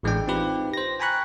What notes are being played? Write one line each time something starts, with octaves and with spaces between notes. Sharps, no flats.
A1 E3 G#3 D4 D5 G5
C4 D#4 F4 G4 B4
C5 A#6
G5 G#5 A#5 B5 C#6 F#6